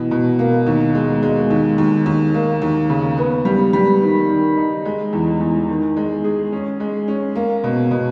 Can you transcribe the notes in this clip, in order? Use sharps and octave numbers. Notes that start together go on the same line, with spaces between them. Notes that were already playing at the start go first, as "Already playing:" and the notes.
Already playing: B2 E3
B2
A#3
D#2
G#3
G#3
D#2
D#2
D#2
A#3
D#2
C#3
B3
G3
G3
D#3
D#3
D#4
G#3
E2
E2
D#3
G#3
G#4
C#4
G#3
C#4
A#3
B2
B2